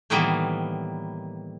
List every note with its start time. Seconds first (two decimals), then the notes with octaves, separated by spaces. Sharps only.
0.10 A2 D#3 E3 G3 A#3 B3